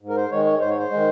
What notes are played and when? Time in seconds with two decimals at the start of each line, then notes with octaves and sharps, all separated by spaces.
0.02 G#2
0.09 A#4
0.17 C5
0.31 D#3 G#3 C#5
0.45 C#5
0.60 G#2 C5
0.69 C#5
0.79 C5
0.90 D#3 G#3